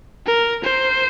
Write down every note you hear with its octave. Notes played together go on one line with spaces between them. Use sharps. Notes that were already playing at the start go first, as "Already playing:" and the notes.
A#4
C5